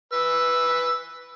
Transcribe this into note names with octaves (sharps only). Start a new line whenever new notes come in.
B4 E6